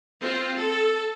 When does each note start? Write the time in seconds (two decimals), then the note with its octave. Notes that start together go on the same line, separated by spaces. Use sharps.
0.22 C4 F4
0.57 A4